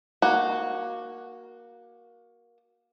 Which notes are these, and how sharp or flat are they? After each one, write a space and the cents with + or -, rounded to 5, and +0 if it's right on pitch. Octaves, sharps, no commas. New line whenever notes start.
A#3 +15 F#4 +0